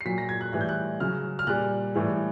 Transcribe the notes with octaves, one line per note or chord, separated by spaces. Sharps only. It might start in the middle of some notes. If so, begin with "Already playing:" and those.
C7
A#2 F#3 B6
A#6
G#6
F#6
A2 E3 G3 F#6
G6
F#6
C#3 F#3 F6
F6
A#2 G3 F#6
A2 E3 G3